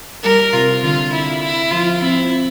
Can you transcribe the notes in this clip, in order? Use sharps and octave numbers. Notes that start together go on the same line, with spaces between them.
G3 A#4
C3 F4
D3 F4
E4
E4
F3 F4
C4 E4